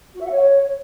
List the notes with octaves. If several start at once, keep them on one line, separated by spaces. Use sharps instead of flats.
F#4
E5
F#5
C#5